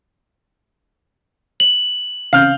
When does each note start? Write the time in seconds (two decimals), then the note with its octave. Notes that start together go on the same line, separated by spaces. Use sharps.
1.60 F#7
2.33 C#3 C4 F5 F6 G6